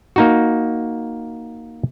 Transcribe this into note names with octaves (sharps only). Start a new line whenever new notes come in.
A#3 D#4 F#4